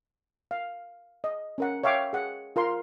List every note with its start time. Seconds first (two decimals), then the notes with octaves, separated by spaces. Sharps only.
0.51 F5
1.24 D#5
1.58 C#4 A#4 F#5
1.84 C#5 E5 F5 G5 D6
2.13 G#4 F#5
2.56 F4 A#4 F5 C6